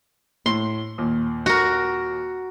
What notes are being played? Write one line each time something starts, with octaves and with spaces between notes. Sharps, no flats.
A2 C6
D#2 A#2
F#4 A#4